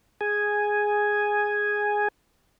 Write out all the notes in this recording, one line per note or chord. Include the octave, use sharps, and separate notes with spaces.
G#4 G#5